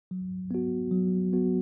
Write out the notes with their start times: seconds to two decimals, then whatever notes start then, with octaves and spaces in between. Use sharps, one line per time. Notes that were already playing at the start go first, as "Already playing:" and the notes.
0.11 F#3
0.51 B3 F#4
0.91 F#3
1.33 B3 F#4